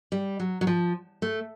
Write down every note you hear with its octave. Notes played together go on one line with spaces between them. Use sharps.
G3
F#3
F#3
F3
A3